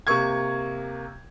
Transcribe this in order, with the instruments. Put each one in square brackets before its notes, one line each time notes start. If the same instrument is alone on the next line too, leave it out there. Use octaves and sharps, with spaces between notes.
[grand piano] C3 A#3 C#6 G#6